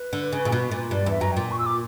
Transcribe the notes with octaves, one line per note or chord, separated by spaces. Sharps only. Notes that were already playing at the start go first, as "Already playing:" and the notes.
Already playing: B4
D3
C#3
A#2
B2
A#2
G2 D5
E2 E5
F#2 A#5
A#2 G5
C#6
E6
D6